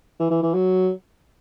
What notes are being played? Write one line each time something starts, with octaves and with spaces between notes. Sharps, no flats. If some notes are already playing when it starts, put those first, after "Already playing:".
E3
E3
E3
F#3